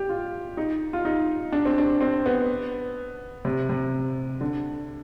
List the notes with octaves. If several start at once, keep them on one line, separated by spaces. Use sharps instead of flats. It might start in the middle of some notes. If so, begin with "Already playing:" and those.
Already playing: G4
F4
D#4
F4
D#4
D4
C4
D4
C4
B3
C3
C3
D3